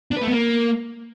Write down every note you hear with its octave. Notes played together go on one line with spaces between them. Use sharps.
D4
B4
A3
B3
A#3